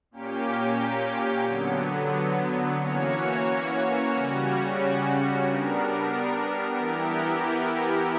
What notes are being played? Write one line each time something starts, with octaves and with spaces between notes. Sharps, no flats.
A#2 A#3 C#4 G4
D3 F#3 B3
E3 A#3 C#4 F#4 C#5
C#3 G3 C#4 F#4
G3 B3 D4 A#4
E3 B3 E4 G4 A#4